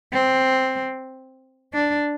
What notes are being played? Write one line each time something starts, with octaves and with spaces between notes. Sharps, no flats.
C4
D4